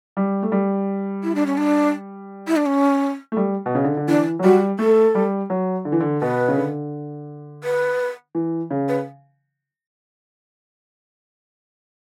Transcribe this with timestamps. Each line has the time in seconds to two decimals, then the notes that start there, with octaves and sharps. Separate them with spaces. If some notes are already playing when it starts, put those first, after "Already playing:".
0.17 G3
0.43 A3
0.52 G3
1.23 E4
1.35 D4
1.46 C#4
1.57 D4
2.47 E4
2.56 D4
2.65 C#4
3.32 A3
3.37 G3
3.66 B2
3.75 C#3
3.84 D3
3.97 D3
4.08 E3 D4
4.39 F#3
4.43 G3 F#4
4.79 A3 A4
5.15 G3
5.50 F#3
5.85 D3
5.92 E3
6.00 D3
6.21 B2 B4
6.48 C#3
6.57 D3
7.63 B4
8.35 E3
8.71 C#3
8.88 B4